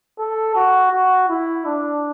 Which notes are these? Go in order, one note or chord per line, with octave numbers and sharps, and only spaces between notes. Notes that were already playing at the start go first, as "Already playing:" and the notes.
A4
F#4
F#4
E4
D4